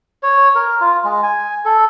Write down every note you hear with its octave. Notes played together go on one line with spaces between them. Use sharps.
C#5
A#4
F4
G#3
G#5
A4